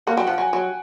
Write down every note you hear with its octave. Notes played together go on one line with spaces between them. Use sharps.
A#3 F#5
F#3 G5
F3 F#5
F#3 G#5
F#3